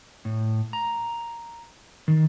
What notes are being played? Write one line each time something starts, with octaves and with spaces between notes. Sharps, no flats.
A2
A#5
D#3